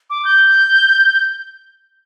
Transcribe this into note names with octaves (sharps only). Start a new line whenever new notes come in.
D6
G6